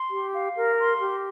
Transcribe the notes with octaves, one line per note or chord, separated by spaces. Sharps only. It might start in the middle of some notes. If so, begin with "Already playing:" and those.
Already playing: C6
G4
F5
A#4
C6
G4